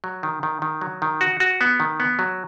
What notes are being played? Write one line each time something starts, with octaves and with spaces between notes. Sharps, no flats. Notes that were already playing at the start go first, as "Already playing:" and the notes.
F#3
D#3
D#3
D#3
F#3
D#3
F#4
F#4
B3
D#3
B3
F#3